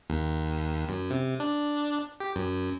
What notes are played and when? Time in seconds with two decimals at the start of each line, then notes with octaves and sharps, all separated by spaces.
0.10 D#2
0.89 F#2
1.11 C3
1.40 D4
2.20 G4
2.36 F#2